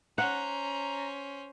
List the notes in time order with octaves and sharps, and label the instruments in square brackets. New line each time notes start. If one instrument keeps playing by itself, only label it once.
[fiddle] C#4 C5 [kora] F#5 [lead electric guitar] A#5